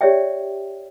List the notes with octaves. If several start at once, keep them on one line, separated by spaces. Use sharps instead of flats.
G4 C#5 D5 E5 G5